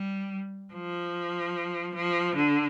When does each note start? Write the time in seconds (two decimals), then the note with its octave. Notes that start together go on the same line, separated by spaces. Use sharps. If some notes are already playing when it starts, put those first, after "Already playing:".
Already playing: G3
0.73 F3
1.96 F3
2.36 D3